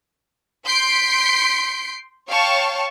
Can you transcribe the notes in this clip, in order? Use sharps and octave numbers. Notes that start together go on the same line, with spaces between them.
C6 G6 B6 C7 D7
C#5 F5 G5 A5 C#6